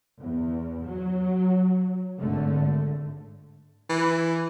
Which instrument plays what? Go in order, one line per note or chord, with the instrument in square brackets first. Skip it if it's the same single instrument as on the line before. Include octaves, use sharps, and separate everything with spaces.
[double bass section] E2
F#3
G#1 D3 A3
[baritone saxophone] E3